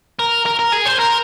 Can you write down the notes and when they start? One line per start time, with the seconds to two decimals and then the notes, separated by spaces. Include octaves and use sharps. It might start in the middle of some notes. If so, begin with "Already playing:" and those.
0.19 A#4
0.46 A#4
0.59 A#4
0.73 G#4
0.86 C5
1.00 A#4